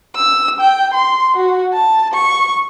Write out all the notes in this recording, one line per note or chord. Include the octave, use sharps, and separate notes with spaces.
E6
G5
C6
F#4
A5
C#6